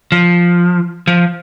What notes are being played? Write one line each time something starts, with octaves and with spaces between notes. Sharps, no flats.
F3
F3